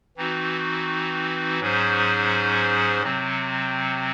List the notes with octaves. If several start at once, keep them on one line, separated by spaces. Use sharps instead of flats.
E3 C4 D#4 F#4
G#2 F#3 C#4 G#4 C5
C3 F#3 C4